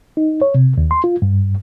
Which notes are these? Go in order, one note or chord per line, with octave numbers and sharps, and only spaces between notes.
D#4
C#5
C3
D#2
C6
F4
G2